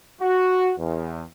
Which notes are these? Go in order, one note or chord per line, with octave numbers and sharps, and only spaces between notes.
F#4
E2